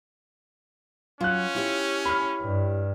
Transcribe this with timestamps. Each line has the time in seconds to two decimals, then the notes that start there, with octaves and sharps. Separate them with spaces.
1.21 F#3 C#4 F4 F#6
1.55 E4 G4 C#5
2.05 B5 F6
2.41 G2